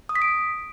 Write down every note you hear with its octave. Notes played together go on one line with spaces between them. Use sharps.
D#6
B6
D7